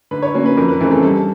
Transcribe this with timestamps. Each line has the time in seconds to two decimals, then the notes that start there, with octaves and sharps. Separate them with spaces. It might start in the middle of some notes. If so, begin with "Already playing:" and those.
0.11 D3 B4
0.22 C#5
0.34 F#3 A#3 C#4
0.46 B4
0.57 F2 A#4
0.68 B4
0.80 C#3 E3 A3 C4 A#4
0.91 A4
1.03 G2 A4